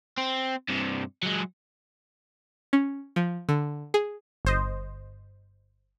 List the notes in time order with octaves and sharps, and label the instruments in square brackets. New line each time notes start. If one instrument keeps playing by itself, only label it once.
[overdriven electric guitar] C4
G2 C3
F#3 G#3
[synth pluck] C#4
F3
D3
G#4
G1 C5 D#5